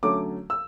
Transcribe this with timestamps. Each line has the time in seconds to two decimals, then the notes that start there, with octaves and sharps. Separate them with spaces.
0.03 D3 F#3 A3 C#4 D6
0.50 E6